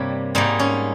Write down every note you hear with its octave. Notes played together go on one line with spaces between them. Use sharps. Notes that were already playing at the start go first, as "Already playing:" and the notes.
Already playing: G2 C3 G3 A#3 C#5
G#2 G3 A#3 D#4
C#4